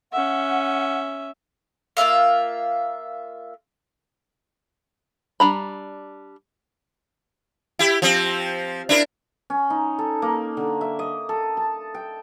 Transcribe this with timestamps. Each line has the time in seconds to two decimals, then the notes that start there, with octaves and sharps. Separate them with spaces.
0.13 C#4 E5 F#5
1.97 A#3 F4 E5 F5
5.40 G3 D4 A#5 B5
7.79 E4 G4
8.02 F3 C4
8.89 D4 E4 A#4
9.50 C#4
9.70 D#4
9.99 A4
10.22 A#3
10.57 D3
10.81 E5
10.99 D#5
11.29 A4
11.57 A5
11.94 G5